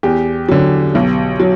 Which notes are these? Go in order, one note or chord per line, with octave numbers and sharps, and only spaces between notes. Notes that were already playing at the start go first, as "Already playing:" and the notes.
E2 G4
D3 F#3
B1
F#3